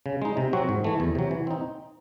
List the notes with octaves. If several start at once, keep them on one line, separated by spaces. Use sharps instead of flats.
C#3
G#3 D#4
C3
F#3 C4 F#4
G#2
E3 A3
E2
C3 F#3
E3
C4 D#4